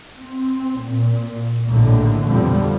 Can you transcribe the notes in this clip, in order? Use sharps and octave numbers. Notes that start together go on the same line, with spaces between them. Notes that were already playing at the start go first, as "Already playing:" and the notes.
C4
A#2
A#1 D#2 A2 D3
F2 B2 D3 F3 G3